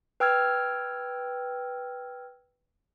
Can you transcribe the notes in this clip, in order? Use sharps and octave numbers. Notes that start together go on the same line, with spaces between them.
B4 G5 E6 F6 G#6